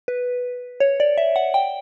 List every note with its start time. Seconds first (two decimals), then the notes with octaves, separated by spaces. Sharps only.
0.08 B4
0.80 C#5
1.00 D5
1.18 E5
1.36 F#5
1.54 G5